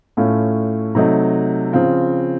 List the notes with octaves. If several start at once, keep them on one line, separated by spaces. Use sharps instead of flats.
A2 A3 C#4 F4
C3 F#3 A3 D#4
C#3 F3 C4 F4